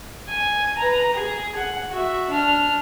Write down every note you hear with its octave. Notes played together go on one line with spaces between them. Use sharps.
G#5
B4 A#5
G#4
F#5
F#4 E5
D4 F6